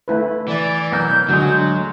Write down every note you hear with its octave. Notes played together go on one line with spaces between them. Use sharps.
A3 E4 B4
E3 D5
B2 F#3 A#4 G6
D2 D3 F#3 G#3 F#4